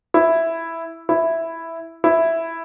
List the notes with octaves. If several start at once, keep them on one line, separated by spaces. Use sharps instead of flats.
E4
E4
E4